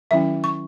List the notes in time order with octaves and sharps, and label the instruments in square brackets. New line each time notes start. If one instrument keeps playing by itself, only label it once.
[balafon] D#3 F#3 C#4 E4 E5
C#6